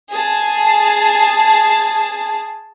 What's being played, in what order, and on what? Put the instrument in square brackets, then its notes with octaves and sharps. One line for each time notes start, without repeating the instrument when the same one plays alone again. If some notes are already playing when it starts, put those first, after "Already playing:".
[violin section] G#4 A5